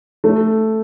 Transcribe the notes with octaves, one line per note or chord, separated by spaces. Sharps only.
A3